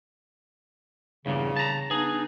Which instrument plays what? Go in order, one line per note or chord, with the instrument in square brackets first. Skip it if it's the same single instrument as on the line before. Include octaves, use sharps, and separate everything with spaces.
[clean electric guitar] E2 G2 A#2 [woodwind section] C#3
[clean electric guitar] A5 A#5
[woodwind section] B3 D4 D#4 [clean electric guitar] G#4